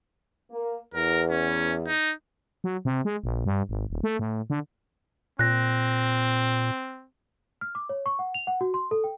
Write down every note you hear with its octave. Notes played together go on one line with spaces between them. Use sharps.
A#3
E2 A#4
C#4
D#4
F#3
C3
G#3
A#1
G2
G#1
D#1
A3
A2
D3
A#2 C4 F#6 A#6
F6
D6
C#5
C#6
F#5
F7
F#5
F#4
C6
A4
G5